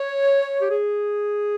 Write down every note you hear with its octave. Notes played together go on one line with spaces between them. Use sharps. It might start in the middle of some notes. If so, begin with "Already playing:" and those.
Already playing: C#5
G4
G#4